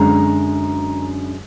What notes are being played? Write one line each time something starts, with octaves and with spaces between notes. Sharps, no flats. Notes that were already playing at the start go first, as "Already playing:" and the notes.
Already playing: F#2 D3 G#3 A#5